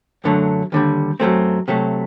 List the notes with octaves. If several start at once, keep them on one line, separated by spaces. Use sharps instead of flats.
F#2 D3 F#3 A3
D#2 D3 G3
F#2 F#3 A3 C4
C3 F#3 A3